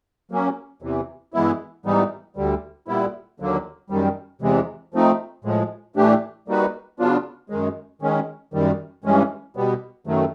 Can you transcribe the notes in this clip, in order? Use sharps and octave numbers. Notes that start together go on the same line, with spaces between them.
F#3 A#3 C#4
E2 C3 E3
G2 E3 G#3 B3 E4
G#2 E3 G3 B3 D#4
D2 D3 G3
A#2 G3 B3 E4
D#2 D3 F#3 A#3
F#2 D#3 G3
E2 C3 E3 G#3
F3 A3 C4 D#4
A2 F3 G#3
A2 E3 A3 D4 G4
G3 A#3 D#4 F#4 B4
C#3 F#3 B3 D4 F4
F#2 D#3 G#3
D#3 G#3 C#4
F#2 D#3 G3
G2 E3 G#3 C#4
B2 G3 B3
F#2 D#3 F#3 A3